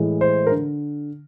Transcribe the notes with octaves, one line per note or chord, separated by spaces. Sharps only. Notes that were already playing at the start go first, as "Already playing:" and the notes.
Already playing: A2 E3 G#3
C5
A#4
D3